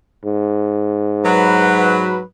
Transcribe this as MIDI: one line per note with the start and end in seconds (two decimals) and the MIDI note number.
0.25 2.23 44
1.24 2.21 54
1.24 2.21 71